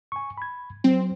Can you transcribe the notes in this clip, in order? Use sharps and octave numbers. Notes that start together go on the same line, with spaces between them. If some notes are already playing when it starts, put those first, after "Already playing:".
G#5 C#6
B5 G#6
F#3 C4